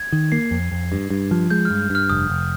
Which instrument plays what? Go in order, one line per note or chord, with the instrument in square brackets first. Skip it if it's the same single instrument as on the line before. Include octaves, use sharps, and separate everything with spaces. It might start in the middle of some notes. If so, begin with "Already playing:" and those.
Already playing: [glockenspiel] G#6
[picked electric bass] D#3
[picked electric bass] A#3 [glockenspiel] C7
[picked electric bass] F2
F2
G2
G2
F3
[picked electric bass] G#3 [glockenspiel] G6
[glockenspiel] F6
[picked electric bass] G2
[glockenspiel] G6
[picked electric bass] G2 [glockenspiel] F6
[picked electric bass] F1 [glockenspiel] D#6
[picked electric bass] F1